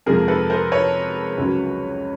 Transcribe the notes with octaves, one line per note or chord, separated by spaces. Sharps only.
F2 C3 F3 G#3 G#4 A#4
A4 B4
A#4 C5
B4 C#5
C#2 C#3 F#3